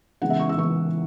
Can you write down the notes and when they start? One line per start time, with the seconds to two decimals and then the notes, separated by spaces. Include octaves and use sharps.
0.22 C#3 E3 G#3 B3 F#5
0.30 E5
0.40 C#6
0.49 E6
0.58 C#3 E3 G#3 B3 C#6